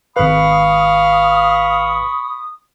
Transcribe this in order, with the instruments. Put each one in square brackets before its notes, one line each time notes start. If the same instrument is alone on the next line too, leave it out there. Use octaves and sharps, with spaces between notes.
[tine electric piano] G#1 B4 [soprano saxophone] F5 [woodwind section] B5 C#6 D#6